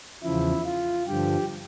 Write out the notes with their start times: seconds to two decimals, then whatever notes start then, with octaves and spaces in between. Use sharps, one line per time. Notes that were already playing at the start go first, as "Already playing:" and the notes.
0.23 E2 C#3 F3 E4
0.65 F4
1.07 G2 D3 F3 G4